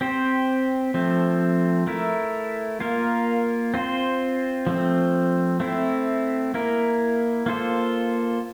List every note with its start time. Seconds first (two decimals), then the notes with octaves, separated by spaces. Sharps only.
0.01 C4 G4 C5
0.94 F3 A3 C4
1.87 A3 E4 A#4
2.80 A#3 F4 A#4
3.74 C4 F4 C5
4.67 F3 A3 C4
5.60 A3 C4 E4
6.54 A#3 E4 A#4
7.46 A#3 F4 A4 C5